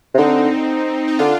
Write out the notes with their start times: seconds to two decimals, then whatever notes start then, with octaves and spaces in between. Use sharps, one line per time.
0.14 C3
0.18 D3 C4 D#4
1.08 D#4
1.19 D3 D4 F4